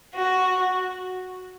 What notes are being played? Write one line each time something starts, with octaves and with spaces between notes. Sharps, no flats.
F#4